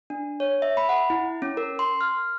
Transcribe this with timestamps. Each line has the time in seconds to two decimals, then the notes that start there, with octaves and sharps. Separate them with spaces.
0.10 D4
0.40 C#5
0.62 E5
0.77 B5
0.89 F#5
1.10 E4
1.42 C#4
1.57 A#4
1.79 C6
2.01 F6